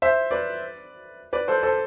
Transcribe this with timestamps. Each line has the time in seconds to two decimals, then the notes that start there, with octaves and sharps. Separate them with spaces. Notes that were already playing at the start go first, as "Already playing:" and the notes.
0.02 C5 E5
0.31 B4 D5
1.33 B4 D5
1.48 A4 C5
1.63 A4 C5